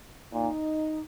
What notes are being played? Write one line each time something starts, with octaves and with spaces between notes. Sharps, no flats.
A#2 D#4